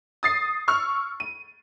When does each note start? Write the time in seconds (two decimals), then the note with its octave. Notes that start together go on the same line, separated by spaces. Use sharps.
0.23 D#6 A6 C7
0.68 C#6 E6 F6
1.20 D#7